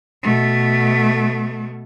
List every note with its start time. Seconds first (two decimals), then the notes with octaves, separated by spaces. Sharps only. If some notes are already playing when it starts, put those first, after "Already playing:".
0.23 B2 A3